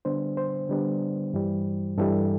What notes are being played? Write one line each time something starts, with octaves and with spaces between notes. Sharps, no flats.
D3 G3 B3 D4 C5
C5
D3 G3 B3 D4
G2 E3 G3
G2 E3 G3 A4